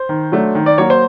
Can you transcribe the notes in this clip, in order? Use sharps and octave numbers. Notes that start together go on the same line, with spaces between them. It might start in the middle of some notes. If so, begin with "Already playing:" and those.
Already playing: C5
D#3
F#3 A3 D4
D#3
D5
F#3 A#3 C#5
C5